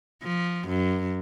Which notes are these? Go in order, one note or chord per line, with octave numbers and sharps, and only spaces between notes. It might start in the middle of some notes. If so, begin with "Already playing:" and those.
F3
F#2